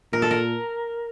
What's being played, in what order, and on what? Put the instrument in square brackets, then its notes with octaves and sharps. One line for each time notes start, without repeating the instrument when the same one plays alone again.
[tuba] A#2 [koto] A#4
[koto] A4
A#4